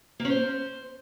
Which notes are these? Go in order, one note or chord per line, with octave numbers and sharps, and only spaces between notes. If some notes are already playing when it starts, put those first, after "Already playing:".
A#3
C#4
C5